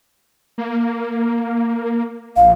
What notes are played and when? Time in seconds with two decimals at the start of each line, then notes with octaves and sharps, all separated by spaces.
0.58 A#3
2.37 A#1 F5